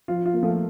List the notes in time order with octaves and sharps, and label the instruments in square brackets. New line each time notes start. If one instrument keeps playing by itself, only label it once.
[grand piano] F3 [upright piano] F4
[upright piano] F4
[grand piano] A#3
[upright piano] F3 [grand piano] A3